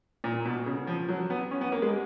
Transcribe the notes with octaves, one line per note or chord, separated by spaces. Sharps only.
A#2
B2
C#3
F3
F#3
B3
C#4
B3
A#3
G#3